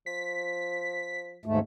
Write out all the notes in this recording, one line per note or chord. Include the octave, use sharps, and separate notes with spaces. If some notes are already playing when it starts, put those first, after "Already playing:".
F3 B6
D#2 G#2 A3